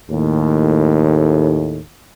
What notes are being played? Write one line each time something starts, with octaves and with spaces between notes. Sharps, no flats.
D#2 A2